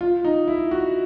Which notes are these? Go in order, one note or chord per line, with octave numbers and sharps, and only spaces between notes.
F4
D#4
E4
F#4